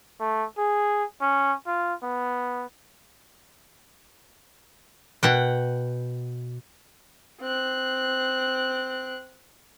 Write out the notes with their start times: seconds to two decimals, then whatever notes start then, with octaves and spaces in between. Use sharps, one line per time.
0.20 A3
0.58 G#4
1.21 C#4
1.67 F4
2.03 B3
5.23 B2 F#5 G5
7.41 C4 F#6